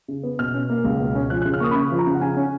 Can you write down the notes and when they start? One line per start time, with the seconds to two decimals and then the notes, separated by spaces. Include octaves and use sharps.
0.08 C#3
0.23 B3
0.39 B2 F6
0.54 C#4
0.70 A#3
0.84 C#2
1.00 B2
1.15 C#4
1.30 F3 F#6
1.42 F#6
1.45 C#3
1.54 F6
1.60 A#3 C#6 D#6
1.71 B5
1.75 C#3 C#6
1.91 F3
1.99 A#5
2.07 C#3
2.15 F#5
2.21 C#3 G#5
2.37 C#4